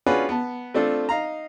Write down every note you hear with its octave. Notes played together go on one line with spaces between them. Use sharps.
C#4 D4 F4 F#4 G#4 B4
B3 A5
A3 C4 D4 F4 A4
D#4 F5 A#5